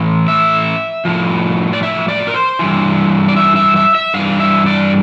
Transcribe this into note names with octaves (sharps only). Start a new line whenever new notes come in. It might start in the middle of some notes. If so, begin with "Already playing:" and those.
Already playing: A2 E3
E5
A2 F3
D5
E5
D5
A#4
C5
G2 E3
D5
E5
E5
E5
E5
G2 E3 F5
E5
D5